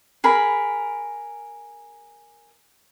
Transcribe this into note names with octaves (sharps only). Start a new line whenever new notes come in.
G#4 A#4 B5